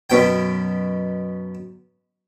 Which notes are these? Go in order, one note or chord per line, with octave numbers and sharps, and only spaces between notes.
F#2 B2 G5